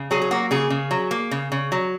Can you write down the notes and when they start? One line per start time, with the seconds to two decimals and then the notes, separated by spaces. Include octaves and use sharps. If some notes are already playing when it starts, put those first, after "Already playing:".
Already playing: C#3
0.11 F#3 G#4
0.22 G#4
0.31 A#3 F#4
0.51 C#3 G#4
0.70 C#3
0.91 F#3
1.11 A#3
1.31 C#3
1.52 C#3
1.72 F#3